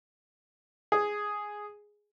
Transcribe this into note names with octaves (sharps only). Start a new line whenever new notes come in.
G#4